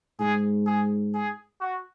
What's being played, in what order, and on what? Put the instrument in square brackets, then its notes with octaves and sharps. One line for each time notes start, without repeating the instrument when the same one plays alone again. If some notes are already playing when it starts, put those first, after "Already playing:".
[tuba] G#2 [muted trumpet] G#4
[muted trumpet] G#4
G#4
F#4